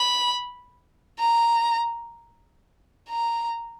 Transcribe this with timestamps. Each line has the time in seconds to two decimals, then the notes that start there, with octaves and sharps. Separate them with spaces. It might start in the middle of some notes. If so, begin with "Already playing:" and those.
Already playing: B5
1.19 A#5
3.10 A#5